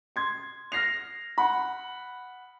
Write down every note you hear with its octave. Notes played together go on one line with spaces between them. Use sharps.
C6 G#6
F6 A#6 C7 F7
F#5 B5